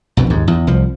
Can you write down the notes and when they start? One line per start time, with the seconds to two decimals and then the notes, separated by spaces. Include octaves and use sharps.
0.17 A#1 F2 B2
0.30 D#2 G#2
0.48 E2
0.67 C2 F3